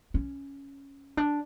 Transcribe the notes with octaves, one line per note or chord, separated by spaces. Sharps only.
C#4
D4